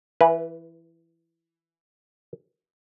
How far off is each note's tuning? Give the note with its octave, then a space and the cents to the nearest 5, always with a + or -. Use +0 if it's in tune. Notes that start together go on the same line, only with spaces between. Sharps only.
E3 +10 B4 -20